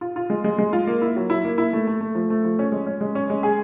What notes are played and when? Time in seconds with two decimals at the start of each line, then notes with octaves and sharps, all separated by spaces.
0.01 F4
0.16 F4
0.30 G#3
0.44 G#3
0.58 G#3
0.73 F4
0.87 A#3
1.02 E4
1.16 F#3
1.30 E4
1.44 A#3
1.58 E4
1.73 A3
1.87 A3
2.01 A3
2.15 F3
2.30 A3
2.44 F3
2.59 C#4
2.72 G#3
2.86 C#4
3.01 G#3
3.15 C#4
3.30 G#3
3.43 G#4